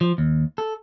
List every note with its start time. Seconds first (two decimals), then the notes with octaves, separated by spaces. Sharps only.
0.01 F3
0.18 D#2
0.58 A4